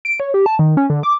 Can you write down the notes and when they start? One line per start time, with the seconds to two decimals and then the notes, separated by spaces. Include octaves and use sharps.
0.05 D7
0.20 C#5
0.34 G4
0.46 A5
0.59 D#3
0.77 C#4
0.90 D3
1.03 D6